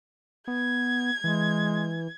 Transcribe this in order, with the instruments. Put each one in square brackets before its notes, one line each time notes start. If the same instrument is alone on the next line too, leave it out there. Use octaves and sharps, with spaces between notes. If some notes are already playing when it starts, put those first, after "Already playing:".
[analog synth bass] B3 [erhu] G#6
[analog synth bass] E3 [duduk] G#3